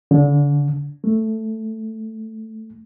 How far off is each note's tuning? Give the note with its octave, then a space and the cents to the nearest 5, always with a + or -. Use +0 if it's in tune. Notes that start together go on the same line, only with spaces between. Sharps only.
D3 -30
A3 +5